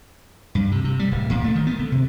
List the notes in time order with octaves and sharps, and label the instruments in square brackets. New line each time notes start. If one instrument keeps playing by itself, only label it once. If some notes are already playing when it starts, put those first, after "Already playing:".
[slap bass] G2
C3
C3
G3
D1
A#2
A3
D#3
B3
D3
C3